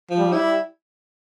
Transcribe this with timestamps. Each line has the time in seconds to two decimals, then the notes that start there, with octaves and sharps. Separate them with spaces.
0.10 F3
0.18 G3
0.33 E4